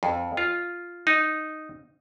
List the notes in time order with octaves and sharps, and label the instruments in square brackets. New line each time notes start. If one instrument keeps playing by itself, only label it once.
[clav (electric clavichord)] F2
F4
D#4